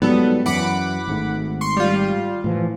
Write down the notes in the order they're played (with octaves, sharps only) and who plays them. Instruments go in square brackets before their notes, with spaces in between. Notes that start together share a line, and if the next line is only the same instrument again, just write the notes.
[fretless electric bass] G#2 F#3 G3 [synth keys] B3 A4
[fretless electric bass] F#2 E3 [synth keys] F#5 B5 D6
[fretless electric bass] G#1 G#2 A3
[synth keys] C6 C#6
G3 F4
[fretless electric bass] A2 E3 F3